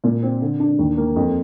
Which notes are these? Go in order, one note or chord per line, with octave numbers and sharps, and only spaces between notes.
A#2
C4
D3
D4
D#2
A#3
F2